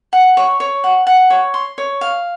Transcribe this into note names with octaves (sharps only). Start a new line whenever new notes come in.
F#5
C#5
C#5
F#5
F#5
C#5
C6
C#5
F5